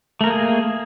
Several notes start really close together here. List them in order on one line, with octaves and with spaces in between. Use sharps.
A3 A#4 A#3 G#4